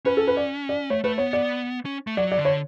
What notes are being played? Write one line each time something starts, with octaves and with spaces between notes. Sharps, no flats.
C#4 B4
A4
B4
D5
D5
A3 C#5
A3 B4
B3 C#5
D5
C#4
A3
F#3 D5
D5
D3
C#5